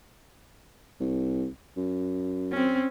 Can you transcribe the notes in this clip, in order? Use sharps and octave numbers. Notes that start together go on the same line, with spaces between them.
C2
F#2
C4 C#4